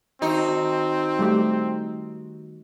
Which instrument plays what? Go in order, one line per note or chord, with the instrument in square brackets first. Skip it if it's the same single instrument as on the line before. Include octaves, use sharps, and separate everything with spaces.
[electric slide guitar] D#3 F#4 [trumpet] C4 [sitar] D#4
[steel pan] G3 A3 G4